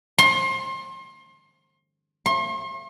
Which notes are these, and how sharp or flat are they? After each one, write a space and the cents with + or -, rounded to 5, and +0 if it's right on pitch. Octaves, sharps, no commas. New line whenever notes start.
C6 +30
C6 +45